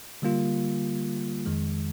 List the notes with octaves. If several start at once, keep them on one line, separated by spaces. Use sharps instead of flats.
D3 G3 A#3 F4
F2 D#3 G#3